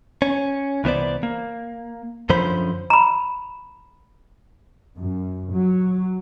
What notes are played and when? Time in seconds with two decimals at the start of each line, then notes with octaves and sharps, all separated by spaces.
0.22 C#4
0.84 C2 E3 B3 C5 D5
1.23 A#3
2.29 F#2 D3 F3 C#4 C5 B5
2.90 A#5 B5
4.96 F#2
5.53 F#3